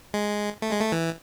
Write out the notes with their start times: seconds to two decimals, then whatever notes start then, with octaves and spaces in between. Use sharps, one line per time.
0.14 G#3
0.62 A3
0.71 G#3
0.80 A3
0.92 E3